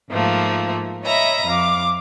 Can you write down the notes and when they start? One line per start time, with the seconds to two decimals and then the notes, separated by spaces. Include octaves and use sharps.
0.11 G#2 F3 A3 A#3
1.04 C#5 D#5 E5 A#5 B5
1.46 F2 F5 D6